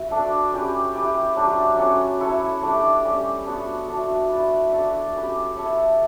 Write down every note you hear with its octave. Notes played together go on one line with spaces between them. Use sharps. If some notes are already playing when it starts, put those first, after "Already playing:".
Already playing: E4 F#4 B4 E5
D4 A4 D5
C#4 G4 B4
E4 G4 B4
F#3 A3 D4 G4
F#3 C#4 F#4 A4
E4 A4 C#5
A3 D4 G4 D5
G3 C#4 G4
B3 D4 F#4
A3 D4 F#4
E4 B4 D5
D4 F#4 A4
C#4 G4 B4
E4 A4 C#5 E5